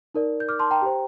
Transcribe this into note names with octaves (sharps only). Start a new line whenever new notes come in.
D#4 A#4 D5
G6
D6 F6
A5 C6
G5 A#5
G4 C5